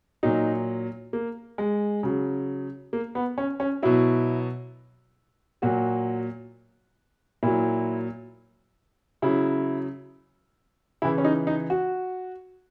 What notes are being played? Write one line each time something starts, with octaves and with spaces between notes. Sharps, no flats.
A#2 F#3 D#4
A#3
G#3
C#3 F#3
A#3
B3
C#4
C#4
B2 F#3 E4
A#2 F#3 F#4
A#2 F#3 E4
C#3 F#3 E4
C#3 E3 E4
C#4
D#4
D#4
F#4